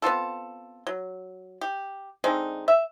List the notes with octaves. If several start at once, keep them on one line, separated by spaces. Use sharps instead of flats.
B3 C4 F4 A4
F#3
G4
D3 G#3 C4 D#4
E5